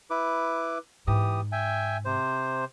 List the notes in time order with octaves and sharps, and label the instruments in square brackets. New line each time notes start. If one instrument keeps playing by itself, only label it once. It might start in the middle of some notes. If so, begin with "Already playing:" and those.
[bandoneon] E4 B4 D6
[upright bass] G#2 [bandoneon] E3 G4 D#6
[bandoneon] E5 G5 G#5
C3 C5